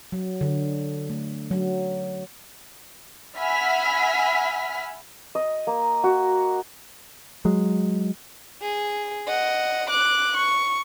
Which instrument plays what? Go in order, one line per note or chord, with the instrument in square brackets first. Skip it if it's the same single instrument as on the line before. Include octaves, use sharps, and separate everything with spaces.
[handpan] F#3
D3
A3
F#3
[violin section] E5 F#5 G#5 B5 F6 B6
[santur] D#5
A#3
F#4
[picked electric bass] F#3 G#3
[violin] G#4
D#5 F#5
D6 F#6
C#6